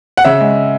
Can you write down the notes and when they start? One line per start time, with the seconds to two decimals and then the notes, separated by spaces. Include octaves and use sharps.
0.17 F#5
0.24 C#3 E5
0.41 G#3